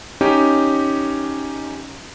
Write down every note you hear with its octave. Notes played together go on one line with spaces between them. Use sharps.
C#4 D#4 G4